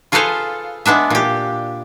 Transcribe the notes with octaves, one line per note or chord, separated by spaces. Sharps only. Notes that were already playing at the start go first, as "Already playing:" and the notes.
F4 G#4 A4 B4 C5 F5
G#3 B3 D4 E5
A#2 G4